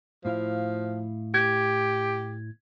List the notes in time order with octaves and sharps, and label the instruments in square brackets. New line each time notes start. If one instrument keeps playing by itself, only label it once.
[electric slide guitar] A2 E4 F5 [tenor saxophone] F3
[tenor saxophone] G4 [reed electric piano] G#6